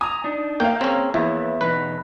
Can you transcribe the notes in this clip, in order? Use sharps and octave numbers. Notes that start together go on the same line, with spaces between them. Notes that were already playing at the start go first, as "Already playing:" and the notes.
G#5 A#5 D#6
D4 D#4
A#3 F5 G5
C4 C#4 G#4 C#5 A#5
E2 A#3 E4 B4 C#5
E2 B2 D#4 B4